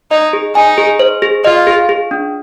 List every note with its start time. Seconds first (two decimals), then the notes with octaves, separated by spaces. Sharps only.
0.11 D#4 D#5
0.33 G#4
0.55 D#4 G#5
0.78 G#4
0.99 C5
1.22 G#4
1.45 F4 D#5
1.67 G#4
1.89 G#4
2.11 D4